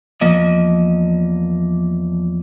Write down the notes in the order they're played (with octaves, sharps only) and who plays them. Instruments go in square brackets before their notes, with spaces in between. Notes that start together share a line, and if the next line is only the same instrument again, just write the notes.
[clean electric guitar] E2 F3 A#3 D#5